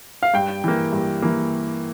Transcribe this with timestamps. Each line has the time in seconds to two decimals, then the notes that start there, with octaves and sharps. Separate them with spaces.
0.23 F5
0.34 G2 G5
0.64 E3 A#3
0.93 G2
1.22 E3 A#3